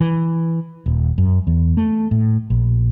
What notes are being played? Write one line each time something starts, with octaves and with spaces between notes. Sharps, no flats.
E3
D#1
F#2
E2
A3
A2
A#1